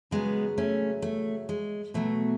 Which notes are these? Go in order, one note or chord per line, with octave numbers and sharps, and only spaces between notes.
C#3 F#3 G#3 B3
A3 C#4
A3
G#3
B2 F#3 A3